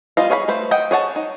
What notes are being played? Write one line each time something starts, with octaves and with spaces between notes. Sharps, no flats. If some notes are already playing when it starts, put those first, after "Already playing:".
G3 B3 F4 D#5 F5
G#4 C#5 F5 G#5 B5
A3 B4 C5
D#5 F#5 G5
G#4 C#5 F#5 A5
D#4